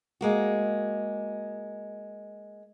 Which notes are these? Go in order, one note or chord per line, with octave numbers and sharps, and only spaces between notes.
G#3 A#3 F#4